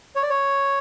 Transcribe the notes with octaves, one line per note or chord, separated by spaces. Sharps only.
C#5
D5
C#5